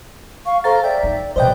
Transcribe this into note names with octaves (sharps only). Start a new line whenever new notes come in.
F5 C#6
A4 C5 F5 A#5 A6
D5 E5 G5
D#4
C3 E3 B4 C5 D5 D#5 G5